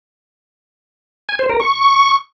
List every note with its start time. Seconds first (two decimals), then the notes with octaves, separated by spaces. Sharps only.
1.29 G#5
1.39 C5
1.49 A#4
1.60 C#6